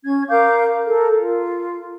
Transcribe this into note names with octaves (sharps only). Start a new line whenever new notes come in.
C#4 G#6
A#4 F5 D6 G6
A4 A#4
F4